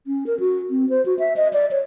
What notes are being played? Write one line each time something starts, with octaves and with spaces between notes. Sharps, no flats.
C#4
A#4
F#4
C4
C5
F#4
E5
D#5
D5
C#5